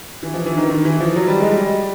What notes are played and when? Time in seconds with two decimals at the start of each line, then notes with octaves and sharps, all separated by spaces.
0.23 E3
0.34 F3
0.46 E3
0.57 D#3
0.69 D#3
0.85 E3
1.00 F3
1.16 F#3
1.27 G3
1.40 G#3
1.51 G3